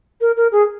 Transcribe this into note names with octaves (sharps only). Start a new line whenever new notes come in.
A#4
A#4
G#4